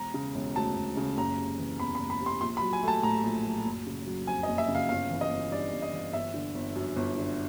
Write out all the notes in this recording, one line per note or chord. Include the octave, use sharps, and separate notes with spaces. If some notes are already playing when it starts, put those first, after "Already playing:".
Already playing: E1 A#5
C#3
E1
D2 A5
E1
C#3
F#1 A#5
C3
E3
E2 B5
B5
F#1
B5
C3
C6
A#1 C6
B5
F#3
G#5
A3
A5
A2 A#5
A#1
F#3
F#1
C#3
F#3
F2 G#5
D#5
F#1
E5
C#3
F5
G1 F5
E3
D#5
G1
G2 D5
G1
D#5
E3
G1 E5
D3
G1
F#2
G1
D3